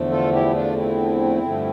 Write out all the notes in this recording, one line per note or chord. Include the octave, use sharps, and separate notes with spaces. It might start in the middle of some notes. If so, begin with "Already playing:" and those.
Already playing: E2 D3 F3 A3
F4 A4
E4 G4
D4 F4
C4 E4
G2 D3 F3 A3